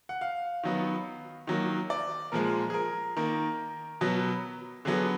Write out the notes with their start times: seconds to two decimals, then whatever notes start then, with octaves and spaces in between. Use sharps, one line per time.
0.09 F#5
0.21 F5
0.63 D#3 F#3 B3
1.47 D#3 F#3 A#3
1.90 D5
2.32 A#2 F3 G#3 A#4
2.70 G#4
2.74 A#4
3.16 D#3 A#3 A#4
4.01 B2 F#3 B3
4.85 D3 F#3 B3 G#4